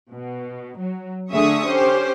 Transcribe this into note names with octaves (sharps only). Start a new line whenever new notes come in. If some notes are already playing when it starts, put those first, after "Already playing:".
B2
F#3
D3 A3 G#4 E5 C#6 D#6
C#4 G4 C5